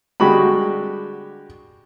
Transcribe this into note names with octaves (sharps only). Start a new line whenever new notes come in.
D3 G3 G#3 F#4 G4 B5